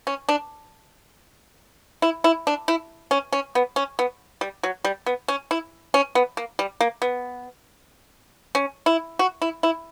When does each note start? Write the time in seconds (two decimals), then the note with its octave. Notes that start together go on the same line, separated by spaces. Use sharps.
0.07 C#4
0.29 D4
2.02 E4
2.24 E4
2.47 D4
2.68 E4
3.11 C#4
3.32 C#4
3.55 B3
3.76 C#4
3.99 B3
4.41 G3
4.63 F#3
4.84 G3
5.06 B3
5.28 C#4
5.51 E4
5.94 C#4
6.15 B3
6.37 A#3
6.59 G3
6.81 A#3
7.02 B3
8.55 C#4
8.86 E4
9.19 F#4
9.42 E4
9.63 E4